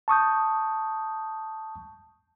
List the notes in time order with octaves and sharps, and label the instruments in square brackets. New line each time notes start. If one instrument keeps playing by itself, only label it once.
[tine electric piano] A5 C#6 D#6 G6